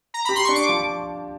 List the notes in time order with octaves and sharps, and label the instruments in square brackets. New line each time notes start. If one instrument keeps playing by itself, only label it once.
[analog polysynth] A#5
[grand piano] G4 [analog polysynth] B5
[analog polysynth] C6
[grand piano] D4 [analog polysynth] C#6
[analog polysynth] D6
[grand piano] F3